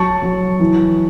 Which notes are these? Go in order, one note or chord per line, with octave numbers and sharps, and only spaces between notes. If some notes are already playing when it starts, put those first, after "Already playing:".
Already playing: F#3 A5 C#6
F#3
E3